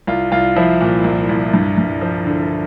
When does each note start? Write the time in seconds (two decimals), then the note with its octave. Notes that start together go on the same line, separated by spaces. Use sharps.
0.07 C2 F4
0.32 C2 F4
0.56 F3 E4
0.80 A#2
1.04 C2
1.29 C2
1.53 G2
1.78 G2
2.01 F3
2.26 D3